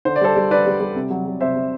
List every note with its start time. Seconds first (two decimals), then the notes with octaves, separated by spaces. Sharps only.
0.05 D3 C5
0.16 D5
0.21 G3 A4 C5
0.36 G3
0.51 D3 B4 D5
0.66 G3
0.80 G3
0.95 C3
1.10 F#3
1.26 F#3
1.41 C3 C5 E5
1.56 C3